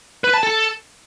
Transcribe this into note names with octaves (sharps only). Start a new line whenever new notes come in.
B4
A5
A4